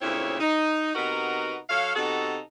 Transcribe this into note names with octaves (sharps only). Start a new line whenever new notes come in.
D2 A#2 C#3 C4 E4 C#5
D#4
C3 B3 D#4 F#4 A#4 B4
F#3 A4 C#5 F5
C3 B3 D#4 F#4 A4